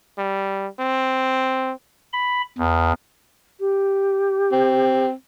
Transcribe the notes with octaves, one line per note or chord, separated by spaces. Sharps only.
G3
C4
B5
E2
G4
C4